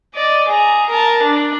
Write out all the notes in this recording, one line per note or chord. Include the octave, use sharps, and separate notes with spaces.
D5 D#5
G#4 A#5
A#4 A5
D4